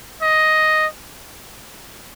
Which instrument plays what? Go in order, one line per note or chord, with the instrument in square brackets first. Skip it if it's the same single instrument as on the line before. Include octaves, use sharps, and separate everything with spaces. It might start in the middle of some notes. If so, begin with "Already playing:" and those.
[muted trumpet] D#5